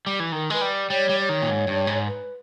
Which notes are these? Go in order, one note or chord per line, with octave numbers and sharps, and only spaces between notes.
G3
E3
D#3 A#4
G#3 B4
G3
G3 C#5
G3
C#5
D#3
A#2
G#2
G2
G#2
B4